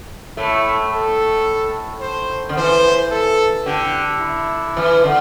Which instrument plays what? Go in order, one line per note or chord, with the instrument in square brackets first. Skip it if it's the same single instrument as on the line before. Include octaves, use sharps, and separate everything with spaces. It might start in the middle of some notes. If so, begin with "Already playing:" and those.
[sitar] A2 A3 [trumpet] E4
[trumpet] A4
C5
[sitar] D3
[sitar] E3 [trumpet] C5
[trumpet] A4
[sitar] D3 [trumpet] G4
[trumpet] E4
[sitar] E3
D3